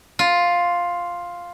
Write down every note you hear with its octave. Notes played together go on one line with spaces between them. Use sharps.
F4